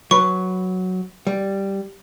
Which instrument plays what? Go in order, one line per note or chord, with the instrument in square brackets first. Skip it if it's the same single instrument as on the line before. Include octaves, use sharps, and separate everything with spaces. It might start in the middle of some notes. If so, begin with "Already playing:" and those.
[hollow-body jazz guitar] F#3 B4 [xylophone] C#6
[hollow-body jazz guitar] G3